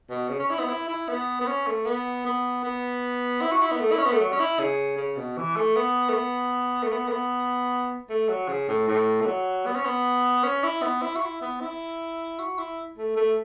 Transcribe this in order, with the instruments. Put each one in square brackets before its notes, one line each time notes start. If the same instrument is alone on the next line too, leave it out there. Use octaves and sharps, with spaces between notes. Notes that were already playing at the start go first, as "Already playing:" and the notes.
[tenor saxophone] B2
C#3
C#4
E4
B3
E4
E4
B3
B3
C#4
A3
B3
B3
B3
E4
F#4
E4
B3
A3
E4
C#4
B3
A3
F#3
C#4
E4
C#3
C#3
B2
E3
A3
B3
A3
B3
A3
B3
A3
B3
A3
F#3
C#3
A2
A2
A3
F#3
B3
C#4
B3
C#4
E4
B3
E4
F#4
E4
B3
E4
F#4
E4
A3
A3